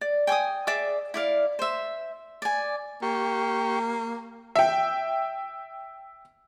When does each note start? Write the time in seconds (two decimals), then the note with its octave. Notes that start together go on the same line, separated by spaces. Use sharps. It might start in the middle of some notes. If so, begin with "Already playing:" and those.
0.01 D5
0.27 G5 G#5 D6 D#6
0.67 G#4 D5 E5 D6
1.14 E4 D5 F5
1.59 C5 E5
2.42 D5 G#5
3.02 A#3 G4 C#6
4.55 E5 G5